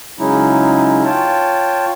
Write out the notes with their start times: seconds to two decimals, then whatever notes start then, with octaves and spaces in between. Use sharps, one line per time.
0.19 C#3 F#3 G#3 C#4 D#4 E4
1.05 F4 C#5 G5 A5